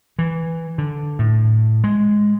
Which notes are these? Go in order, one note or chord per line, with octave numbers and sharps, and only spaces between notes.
E3
D3
A2
G#3